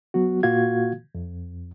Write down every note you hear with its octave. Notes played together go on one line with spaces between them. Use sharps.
F#3 B3 F#4
A#2 A#3 F4 F#4 F5 G#6
F2